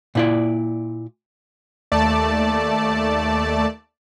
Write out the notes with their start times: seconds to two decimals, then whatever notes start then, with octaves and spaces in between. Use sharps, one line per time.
0.15 A#2 E4 D5
1.92 D#2 A3 D5 A5